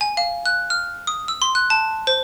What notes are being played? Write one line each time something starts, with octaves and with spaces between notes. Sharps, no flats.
G#5
F5
F#6
F6
D#6
E6
C6
F#6
A5
C5